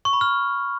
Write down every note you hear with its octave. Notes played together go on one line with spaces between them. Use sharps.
C#6
B5
F6